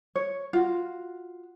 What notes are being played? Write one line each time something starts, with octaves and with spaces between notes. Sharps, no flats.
C#5
F4 F#4